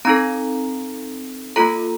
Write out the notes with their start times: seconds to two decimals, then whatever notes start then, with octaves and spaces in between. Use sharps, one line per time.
0.05 C4 D#4 A4 A#5
1.56 A#3 F4 A4 A#5